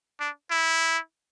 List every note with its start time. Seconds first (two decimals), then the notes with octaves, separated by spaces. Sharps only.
0.20 D4
0.51 E4